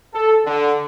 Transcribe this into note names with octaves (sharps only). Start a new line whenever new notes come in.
A4
D3